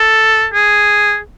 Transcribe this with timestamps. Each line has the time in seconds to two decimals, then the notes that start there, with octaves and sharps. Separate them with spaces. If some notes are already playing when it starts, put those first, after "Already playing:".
Already playing: A4
0.54 G#4